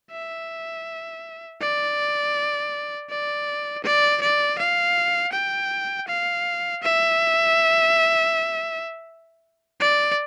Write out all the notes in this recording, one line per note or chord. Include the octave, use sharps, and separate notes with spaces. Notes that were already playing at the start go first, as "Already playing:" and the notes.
E5
D5
D5
D5
D5
F5
G5
F5
E5
D5